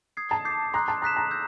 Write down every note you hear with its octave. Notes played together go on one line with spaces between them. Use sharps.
D#6 G#6 C7
A5
D6 G6 C7
A#5 C6 D#6 F#6
A5
A#5 D#6 F#6 B6 E7
A#5
E6 G6